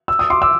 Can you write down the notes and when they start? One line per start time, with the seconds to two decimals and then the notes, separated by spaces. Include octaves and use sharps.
0.08 E6
0.19 D#6
0.30 C6 D6
0.42 D6 E6